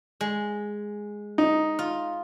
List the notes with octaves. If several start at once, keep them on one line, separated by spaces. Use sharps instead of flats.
G#3
D#4
F4